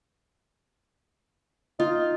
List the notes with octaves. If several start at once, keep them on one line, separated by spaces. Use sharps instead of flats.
D#4 F4